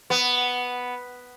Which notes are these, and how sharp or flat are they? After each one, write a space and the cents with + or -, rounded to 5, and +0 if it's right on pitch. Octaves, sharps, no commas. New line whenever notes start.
B3 +0